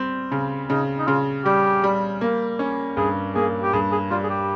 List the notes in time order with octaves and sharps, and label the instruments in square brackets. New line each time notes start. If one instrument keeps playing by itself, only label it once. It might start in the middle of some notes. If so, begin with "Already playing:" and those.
Already playing: [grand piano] G3 C4
C#3
[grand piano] C#3 [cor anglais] D#4
[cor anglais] D#4
[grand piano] C#3 [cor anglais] F4
[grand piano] G3 [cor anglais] G4
[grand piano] G3
A#3
C#4
[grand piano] G2 [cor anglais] G#4
[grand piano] A#3 [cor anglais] G#4
[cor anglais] G4
[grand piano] G2 [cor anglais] G#4
[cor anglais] G#4
[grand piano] G3 [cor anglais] F4
[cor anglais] G#4
G4